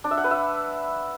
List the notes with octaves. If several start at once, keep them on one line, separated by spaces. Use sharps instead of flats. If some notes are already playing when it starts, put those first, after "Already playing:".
D4
E5
F#5
B4
E5